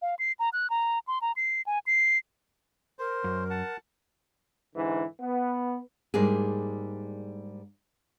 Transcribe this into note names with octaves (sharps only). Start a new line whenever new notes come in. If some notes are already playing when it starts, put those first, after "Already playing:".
F5
C7
A#5
F#6
A#5
C6
A#5
C7
G#5
C7
A#4 C5
F#2
F#5 A5
G#2 D3 E3
B3
G#2 G3 A#3 D4 G#4